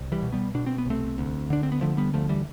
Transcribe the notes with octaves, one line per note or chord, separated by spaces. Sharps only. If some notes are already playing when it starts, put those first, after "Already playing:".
Already playing: C2
E3 G3
B2
G3 B3
B2 D4
C4
B3
C2 A3 C4
D2
D3 D4
C4
B3
D3 F3 A3
G3 B3
D2 F3 A3
E3 G3